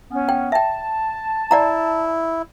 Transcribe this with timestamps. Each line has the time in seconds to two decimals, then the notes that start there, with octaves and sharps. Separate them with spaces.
0.11 B3 C#4
0.29 G5
0.52 E5 G5 A5
1.51 E4 D5 F#5 A#5